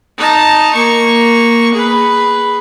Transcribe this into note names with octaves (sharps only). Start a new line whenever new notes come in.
D#4 A5
A#3 C#6
G#4 B4